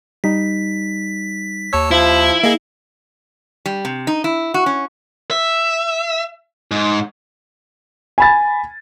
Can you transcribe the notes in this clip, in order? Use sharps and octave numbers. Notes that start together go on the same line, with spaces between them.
G3 D#4 B6
D#2 C#5 A5 E6 G#6
F3 E4
A#3 G#4 D#5 F5
G3
C3
D#4
E4
F#4
C#4
E5
G#2
G#5 B5 A6